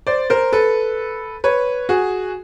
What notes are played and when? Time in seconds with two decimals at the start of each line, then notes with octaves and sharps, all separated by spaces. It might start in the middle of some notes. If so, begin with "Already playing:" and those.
0.07 C5 D5
0.30 A#4 C5
0.53 A4 B4
1.44 B4 C#5
1.89 F#4 G#4